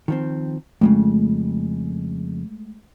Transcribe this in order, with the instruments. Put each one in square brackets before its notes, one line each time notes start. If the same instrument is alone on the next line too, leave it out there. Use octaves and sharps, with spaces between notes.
[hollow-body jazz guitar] D#3 F3 C4
[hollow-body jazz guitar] F2 A2 C#3 [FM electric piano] G#3 A3